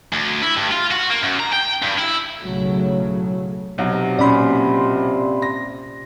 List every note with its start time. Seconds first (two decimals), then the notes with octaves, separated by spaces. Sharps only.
0.13 D2
0.42 E4
0.57 G2
0.72 F4
0.91 F#4
1.10 A#3
1.22 F#2
1.40 A#5
1.53 G5
1.83 G2
1.99 E4
2.41 B1 A2 C#3 F#3 A3
3.78 B1 C3 F#3
4.19 A#2 C#4 D5 B5 C6
5.42 A#6